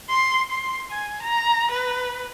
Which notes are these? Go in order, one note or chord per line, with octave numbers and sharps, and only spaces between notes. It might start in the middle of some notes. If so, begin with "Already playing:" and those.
C6
C6
G#5
A#5
B4